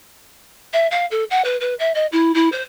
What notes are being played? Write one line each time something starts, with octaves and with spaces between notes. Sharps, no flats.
E5
F5
A4
F#5
B4
B4
E5
D#5
E4
E4
C5